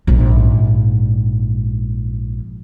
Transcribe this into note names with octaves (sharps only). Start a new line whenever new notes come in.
A#1 G#2